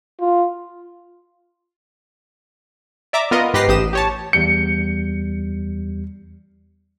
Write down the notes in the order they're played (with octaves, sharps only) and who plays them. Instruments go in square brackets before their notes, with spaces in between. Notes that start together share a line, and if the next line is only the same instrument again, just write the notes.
[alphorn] F4
[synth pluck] D5 E5 A#5 D6
B3 F4 A#4 D#5
G#2 G4 B4 A#6 C7
A1 G4 D#6 E7
G4 C#5 A5
[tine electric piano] E2 G3 G6 [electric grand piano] C#7